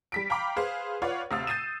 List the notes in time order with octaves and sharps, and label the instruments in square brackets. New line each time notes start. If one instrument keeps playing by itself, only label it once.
[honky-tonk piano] G3 B6 D7
F5 G5 A#5 B5 D6
G#4 B4 C5 F5
F4 B4 C#5 D5 F5 F#5
D2 C3 F5 D#6 E6 A6
G6 A6 C7 D#7 E7